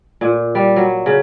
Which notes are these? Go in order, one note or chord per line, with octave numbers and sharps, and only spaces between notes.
A#2
G3
F#3
C#3